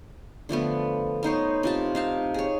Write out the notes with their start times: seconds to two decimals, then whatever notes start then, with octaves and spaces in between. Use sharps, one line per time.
0.49 D3 F3 A3 B3
1.23 B3 D#4 C5 C#5
1.63 C3 F4 A5
1.95 D#4 F5 A5
2.34 G#4 C#5